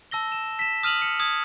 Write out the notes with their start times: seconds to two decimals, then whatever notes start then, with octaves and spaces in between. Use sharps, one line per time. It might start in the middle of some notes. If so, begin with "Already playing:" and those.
0.11 A5 E6 A#6 G7
0.32 E7
0.59 B6 E7
0.83 D#6 F6 D#7 F7 F#7
1.02 D#6 C#7
1.20 D#6 G#6